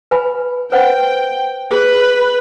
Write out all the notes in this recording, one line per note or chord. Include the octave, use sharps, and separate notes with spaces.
B4 G#5 B5
B4 C5 F#5 G5
G#4 B4